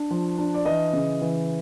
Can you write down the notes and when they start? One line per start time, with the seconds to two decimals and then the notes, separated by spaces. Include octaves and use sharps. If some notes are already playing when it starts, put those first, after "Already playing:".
Already playing: D4
0.11 F3
0.38 D4
0.54 D5
0.65 E3 D#5
0.93 C#3
1.21 E3